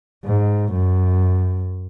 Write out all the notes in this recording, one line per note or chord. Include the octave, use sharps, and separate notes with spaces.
G#2
F#2